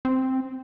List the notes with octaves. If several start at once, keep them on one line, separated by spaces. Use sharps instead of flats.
C4